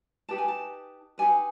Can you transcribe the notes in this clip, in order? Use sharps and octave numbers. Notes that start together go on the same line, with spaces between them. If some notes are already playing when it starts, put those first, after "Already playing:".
D#4 G4 B4 A5
G#5
A5
D#4 G4 B4 G#5